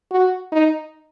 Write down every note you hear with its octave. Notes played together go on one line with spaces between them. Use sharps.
F#4
D#4